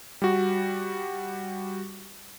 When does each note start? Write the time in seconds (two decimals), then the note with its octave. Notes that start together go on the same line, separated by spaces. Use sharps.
0.22 G3 F#4